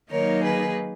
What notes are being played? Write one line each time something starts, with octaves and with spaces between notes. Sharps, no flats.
D#3 F#3 A#3 D#4 A#4 C#5
G#4 B4